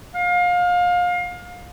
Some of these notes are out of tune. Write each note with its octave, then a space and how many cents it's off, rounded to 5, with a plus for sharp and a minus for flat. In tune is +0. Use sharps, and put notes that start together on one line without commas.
F5 +25